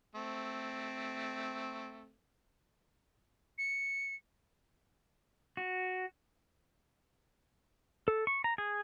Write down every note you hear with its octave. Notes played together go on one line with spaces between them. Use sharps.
A3 C4
C#7
F#4
A4
C#6
A#5
G#4